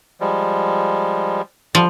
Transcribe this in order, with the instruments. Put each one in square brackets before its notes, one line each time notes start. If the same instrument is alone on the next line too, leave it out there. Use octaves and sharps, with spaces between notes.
[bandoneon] F3 G3 G#3
[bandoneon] D3 G3 [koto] F3